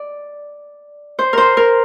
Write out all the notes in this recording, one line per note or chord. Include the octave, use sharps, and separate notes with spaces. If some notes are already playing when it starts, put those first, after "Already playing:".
Already playing: D5
C5
A#4 C5
A#4